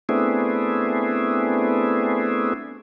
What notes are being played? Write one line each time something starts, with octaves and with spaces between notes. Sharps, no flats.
A3 B3 C4 D4 E4 G#4